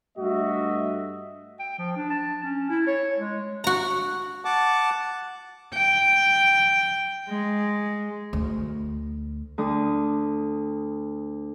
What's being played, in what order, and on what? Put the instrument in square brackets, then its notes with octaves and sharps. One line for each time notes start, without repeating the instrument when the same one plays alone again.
[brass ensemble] G2 A3 F#4 D#5 E5
[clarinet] G5
F3
D4
A5
C#4
E4
C#5
G#3
[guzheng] F#4 A#5
[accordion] F#5 A5 D6
[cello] G5
G#3
[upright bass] D2
[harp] D2 D#6